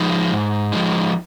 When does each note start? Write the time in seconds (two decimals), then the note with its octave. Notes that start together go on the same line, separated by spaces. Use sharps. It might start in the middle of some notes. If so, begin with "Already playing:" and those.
Already playing: F3 G#3 D#4
0.32 G#2
0.72 F3 G#3 D#4